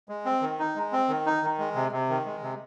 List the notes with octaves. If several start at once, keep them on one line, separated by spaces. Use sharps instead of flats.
G#3
C4
D#3
D#4
G#3
C4
D#3
D#4
D#3
G#3
C3
C3
D#3
G#3
C3